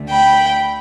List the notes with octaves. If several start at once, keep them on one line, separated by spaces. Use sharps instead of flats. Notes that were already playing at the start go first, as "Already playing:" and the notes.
Already playing: D2 D3 A3
G5 B5